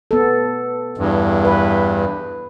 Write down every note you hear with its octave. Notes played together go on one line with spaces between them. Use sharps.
B3 A4
E2 G2
B4